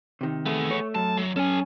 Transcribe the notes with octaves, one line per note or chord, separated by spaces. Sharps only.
C3 D#3
A3 B3 G#4
C#5
F#2 A5
F#3
C#4 A4 G#5